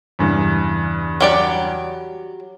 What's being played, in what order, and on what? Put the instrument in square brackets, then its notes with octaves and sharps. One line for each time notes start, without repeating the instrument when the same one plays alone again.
[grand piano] E2 G2 C#3
[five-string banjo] F#3 G4 D5